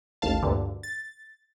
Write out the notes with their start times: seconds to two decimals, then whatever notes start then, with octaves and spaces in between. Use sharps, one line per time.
0.22 A1 D#2 F5 A5
0.43 D2 G2 A#2 D3
0.83 A6